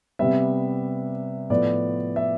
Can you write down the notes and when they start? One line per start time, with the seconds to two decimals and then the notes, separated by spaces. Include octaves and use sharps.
0.19 C3 G3 B3 E5
1.50 A2 F3 B3 D5
2.16 E5